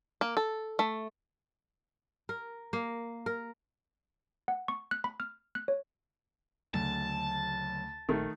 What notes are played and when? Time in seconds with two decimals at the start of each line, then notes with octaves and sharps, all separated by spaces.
0.21 A#3
0.37 A4
0.79 A3
2.29 A#4
2.73 A#3
3.26 A#4
4.48 F#5
4.68 C#6
4.91 F#6
5.04 B5
5.20 F6
5.55 F#6
5.68 C#5
6.74 D2 C#3 F#3 A3 A5
8.09 A#1 D#3 A3